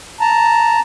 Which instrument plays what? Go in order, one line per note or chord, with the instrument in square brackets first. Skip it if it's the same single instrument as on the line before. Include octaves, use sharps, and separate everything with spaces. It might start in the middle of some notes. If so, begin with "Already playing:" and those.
[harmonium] A5 A#5